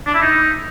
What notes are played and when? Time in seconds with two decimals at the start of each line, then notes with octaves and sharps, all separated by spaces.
0.07 D4
0.14 E4
0.21 D#4